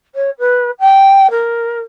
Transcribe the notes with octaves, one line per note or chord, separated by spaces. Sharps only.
C#5
B4
G5
A#4